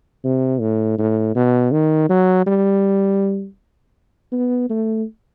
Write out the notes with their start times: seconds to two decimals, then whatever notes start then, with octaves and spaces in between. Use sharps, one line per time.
0.24 C3
0.61 A2
0.98 A2
1.35 B2
1.72 D#3
2.09 F#3
2.46 G3
4.32 B3
4.70 A3